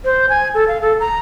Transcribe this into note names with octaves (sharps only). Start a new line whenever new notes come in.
C5
G#5
A4
F5
A4
A#5